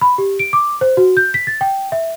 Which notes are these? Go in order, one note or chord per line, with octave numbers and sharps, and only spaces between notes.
B5
G4
D7
D6
C5
F#4
G6
B6
A6
G5
E5